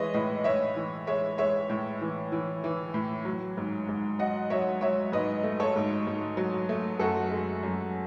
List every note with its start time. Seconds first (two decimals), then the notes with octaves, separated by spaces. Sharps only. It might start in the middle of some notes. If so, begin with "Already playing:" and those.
Already playing: E3 G#3 B4 C#5 D#5 E5
0.14 A2 B4 D#5
0.44 A2 C#5 E5
0.76 E3
1.07 G#3 C#5 E5
1.38 G#3 C#5 E5
1.70 A2
2.01 E3
2.32 E3
2.64 E3
2.94 A2
3.25 F#3
3.57 G#2
3.89 G#2
4.19 F#3 D#5 F#5
4.50 F#3 C#5 E5
4.81 F#3 C#5 E5
5.12 G#2 B4 D#5
5.44 A3
5.60 A4 C#5
5.76 G#2
6.07 G#2
6.37 F#3
6.69 A3
6.99 F#2 F#4 A4
7.31 G#3
7.63 F#2